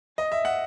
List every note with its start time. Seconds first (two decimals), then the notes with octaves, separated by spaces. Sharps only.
0.18 D#5
0.32 E5
0.45 F#5